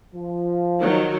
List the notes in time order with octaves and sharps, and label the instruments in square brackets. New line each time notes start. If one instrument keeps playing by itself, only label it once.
[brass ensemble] F3
[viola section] D#3 F#3